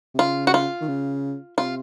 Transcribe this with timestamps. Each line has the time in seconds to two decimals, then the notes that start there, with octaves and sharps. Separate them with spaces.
0.14 C3
0.19 C#3 F4
0.47 F#4
0.54 F4
0.81 D#3
0.88 C#3
1.58 C3 F4